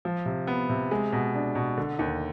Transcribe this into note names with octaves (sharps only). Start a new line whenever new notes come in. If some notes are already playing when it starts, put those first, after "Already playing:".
F3
C3
B3
C3
G#3
B2
D4
B2
D3
D#2